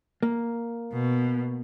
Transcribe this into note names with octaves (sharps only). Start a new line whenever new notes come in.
A#3
B2